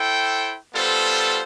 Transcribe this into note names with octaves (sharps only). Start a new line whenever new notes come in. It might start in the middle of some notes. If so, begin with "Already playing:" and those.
Already playing: E4 A4 C5 G5
G3 B3 F4 A4 C5